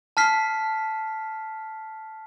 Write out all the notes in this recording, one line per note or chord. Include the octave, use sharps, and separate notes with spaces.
A5 F6 B6 C7